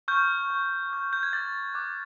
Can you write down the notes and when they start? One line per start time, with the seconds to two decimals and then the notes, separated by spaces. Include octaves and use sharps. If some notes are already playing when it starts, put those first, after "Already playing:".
0.08 C#6 F6 G6
0.50 C#6 F6
0.92 D6 G6
1.13 G6
1.23 G#6
1.33 D6 G6 A6
1.74 D6 F#6